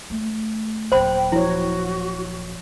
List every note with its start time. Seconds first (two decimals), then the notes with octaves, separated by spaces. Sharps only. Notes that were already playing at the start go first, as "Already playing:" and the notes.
0.10 A3
0.92 D#1 F#3 C5 G5 B5
1.32 F3 E4 F#4 C#5